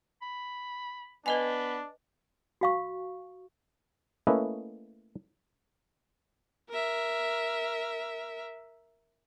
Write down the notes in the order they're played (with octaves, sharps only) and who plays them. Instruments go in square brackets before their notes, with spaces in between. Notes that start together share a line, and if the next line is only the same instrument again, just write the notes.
[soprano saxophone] B5
[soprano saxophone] B3 [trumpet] D4 [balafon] B4 D#5 G#5
[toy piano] F#4 F5 C#6
[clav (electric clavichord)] A3 A#3 C#4 E4 B4 D#5
[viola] A#4 E5